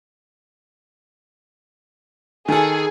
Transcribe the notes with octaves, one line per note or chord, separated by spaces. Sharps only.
D#3 G#4 A4